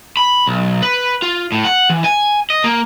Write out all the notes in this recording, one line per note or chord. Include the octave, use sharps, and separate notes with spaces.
B5
B1
B4
F4
A2
F#5
E3
G#5
D#5
A#3